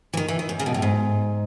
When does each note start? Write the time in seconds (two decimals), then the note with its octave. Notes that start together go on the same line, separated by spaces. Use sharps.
0.13 E3
0.17 D#3
0.28 E3
0.39 D#3
0.49 F#2
0.59 C#3
0.66 B2
0.74 A2
0.82 G#2